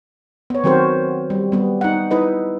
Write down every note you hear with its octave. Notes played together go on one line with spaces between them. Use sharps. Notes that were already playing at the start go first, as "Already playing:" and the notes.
B3 C#5
D#3 F#3 C4 F#4 A#4 C5
G3
G3 B3
D#4 F#5
D#4 E4 B4 D#5